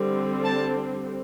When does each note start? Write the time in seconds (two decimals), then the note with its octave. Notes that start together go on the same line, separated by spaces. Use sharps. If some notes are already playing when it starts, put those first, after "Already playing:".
Already playing: D3 G3 C4
0.44 A5